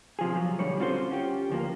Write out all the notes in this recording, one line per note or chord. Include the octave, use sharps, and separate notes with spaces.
C3 F3 G#4
F3 F#3
B1 D3 G3 C#5
C4 C#4 F4 F#4 A4 C5
C#4 F4 G4
D2 F3 A#3